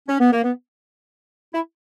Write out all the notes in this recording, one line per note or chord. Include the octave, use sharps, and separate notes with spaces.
C#4
B3
A#3
B3
E4